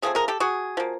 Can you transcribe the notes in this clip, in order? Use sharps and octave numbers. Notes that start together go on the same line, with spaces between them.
C#3 F3 A3 C4 G#4
G#4 A#4
G4 A4
F#4 G#4
F3 A#3